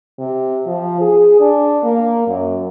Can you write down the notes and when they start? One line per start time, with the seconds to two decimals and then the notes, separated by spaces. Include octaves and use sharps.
0.19 C3
0.66 F3
1.01 G#4
1.40 D4
1.83 A#3
2.28 F#2